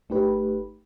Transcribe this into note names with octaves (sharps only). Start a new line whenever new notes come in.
G1 A3 D#4 G4 B4